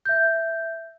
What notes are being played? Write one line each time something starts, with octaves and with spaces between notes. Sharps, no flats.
E5 G6